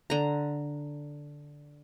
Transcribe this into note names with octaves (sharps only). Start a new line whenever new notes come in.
D3 A#5